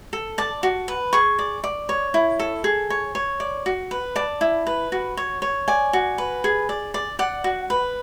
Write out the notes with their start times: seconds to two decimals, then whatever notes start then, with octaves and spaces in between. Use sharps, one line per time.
0.13 A4
0.38 D5 A5
0.63 F#4
0.88 B4
1.13 G#4 C#6
1.39 D5
1.64 D5
1.89 C#5
2.14 E4
2.39 A4
2.64 G#4
2.90 C#5
3.15 C#5
3.40 D5
3.66 F#4
3.91 B4
4.16 D5 A5
4.41 E4
4.67 B4
4.92 F#4
5.17 C#5
5.42 C#5
5.68 D5 G#5
5.93 F#4
6.18 B4
6.44 G#4
6.69 D5
6.94 D5
7.19 D5 F#5
7.44 F#4
7.70 B4